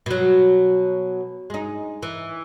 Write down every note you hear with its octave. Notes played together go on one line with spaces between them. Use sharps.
B2 F#3
G#3 D#4
E3